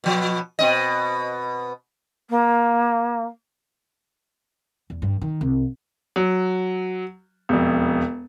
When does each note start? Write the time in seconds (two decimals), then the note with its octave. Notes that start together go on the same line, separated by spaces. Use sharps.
0.04 B2 F3
0.59 B2 C4 D#5
2.30 A#3
4.90 E2
5.02 G2
5.21 D#3
5.41 C2
6.16 F#3
7.49 E1 F2